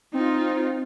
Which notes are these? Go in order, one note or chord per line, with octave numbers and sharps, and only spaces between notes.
C4 D#4 F4